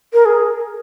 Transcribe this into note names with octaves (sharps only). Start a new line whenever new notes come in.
A#4
G#4